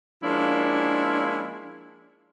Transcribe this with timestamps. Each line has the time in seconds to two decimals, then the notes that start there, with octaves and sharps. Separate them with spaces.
0.23 F3 G#3 A#3 C#4 D4 E4